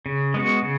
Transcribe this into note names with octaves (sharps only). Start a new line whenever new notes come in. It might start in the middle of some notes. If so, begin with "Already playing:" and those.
C#3
G#3 B3 F#4
C#3